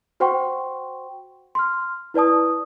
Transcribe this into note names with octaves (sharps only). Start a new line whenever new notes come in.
F#4 C5 F#5 G5 C6 C#6
C6 F6
E4 B4 D5 A5 D#6